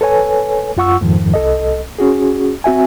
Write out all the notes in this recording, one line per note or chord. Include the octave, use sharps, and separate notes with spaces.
A4 B4 C#5 G#5
F#2 F4 F#5 C#6 E6
F2 G#2 D#3 F3
C2 A4 D#5
C#4 F#4 G#4
C4 F#4 E5 G#5